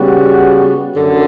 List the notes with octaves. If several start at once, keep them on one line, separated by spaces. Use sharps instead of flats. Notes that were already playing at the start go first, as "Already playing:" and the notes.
Already playing: C#3 G3 B3 F#4
F#2 D3